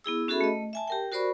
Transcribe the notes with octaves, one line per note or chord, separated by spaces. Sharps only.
B3 E4 G#4 E6
C#4 F#4 G#4 A4 E5 B5
A3 D#5
E5 G#5 A5
G4 A#4 G5
F#4 A#4 C5 D5 B5 C#6